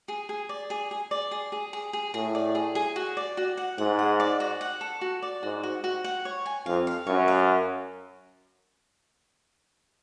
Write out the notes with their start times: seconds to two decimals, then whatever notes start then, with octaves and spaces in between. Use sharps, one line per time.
0.08 G#4
0.29 G#4
0.49 D5
0.70 G#4
0.91 G#4
1.11 D5
1.31 G#4
1.52 G#4
1.73 G#4
1.93 G#4
2.14 A2 G#4
2.35 D5
2.55 G#4
2.75 G#4
2.96 F#4
3.17 D5
3.37 F#4
3.57 F#5
3.78 G#2 F#5
3.99 F#5
4.20 D5
4.40 F#4
4.61 F#5
4.81 A4
5.01 F#4
5.23 D5
5.43 G#2 F#4
5.63 F#4
5.84 F#4
6.04 F#5
6.25 C#5
6.46 G#5
6.66 F2 F5
6.87 F5
7.07 F#2 C#5
7.28 F5